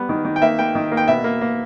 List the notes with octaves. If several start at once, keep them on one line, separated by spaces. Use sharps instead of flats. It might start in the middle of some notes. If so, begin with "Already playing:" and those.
Already playing: G3 B3
D#3
D#3
G5
A#3 E5
A#3 G5
D#3
A#3
G5
B2 E5
A#3
A#3